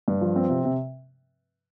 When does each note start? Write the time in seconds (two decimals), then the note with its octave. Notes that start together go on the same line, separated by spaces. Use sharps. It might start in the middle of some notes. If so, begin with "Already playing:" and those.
0.08 G2
0.21 F3
0.36 C4
0.50 C3
0.65 C3